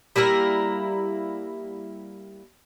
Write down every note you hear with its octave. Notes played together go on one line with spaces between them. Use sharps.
G3 A#3 E4 A#4